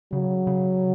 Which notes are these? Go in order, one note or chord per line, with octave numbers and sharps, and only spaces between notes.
C#3 F#3
C#3